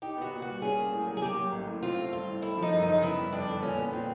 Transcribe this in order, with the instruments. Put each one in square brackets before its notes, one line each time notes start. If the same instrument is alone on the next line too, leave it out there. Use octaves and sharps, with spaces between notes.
[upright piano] D#4 [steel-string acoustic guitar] G4
[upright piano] B3
[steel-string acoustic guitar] F#4
[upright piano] A#2
[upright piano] G3 [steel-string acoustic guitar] F#4
[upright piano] C#4 [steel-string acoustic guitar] G#4
[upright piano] A#3
A2
F#3
[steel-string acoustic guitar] G#4
[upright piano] A#3 [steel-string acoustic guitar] G4
[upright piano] F#3
A1
A2
[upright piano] C4 [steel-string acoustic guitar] F4
[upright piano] A3
[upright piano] G2 [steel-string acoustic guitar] F4
[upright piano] E3
[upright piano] A3 [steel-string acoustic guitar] E4
[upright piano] F3
[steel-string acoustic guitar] D#4
[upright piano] F#2
[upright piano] C#3 [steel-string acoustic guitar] D#4
[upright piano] B3 [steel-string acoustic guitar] E4
[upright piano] G3
[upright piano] F2 [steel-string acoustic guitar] D4
[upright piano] D3
[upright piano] A#2 [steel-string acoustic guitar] C#4
[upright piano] B3
[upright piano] A#2 [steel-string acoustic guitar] C4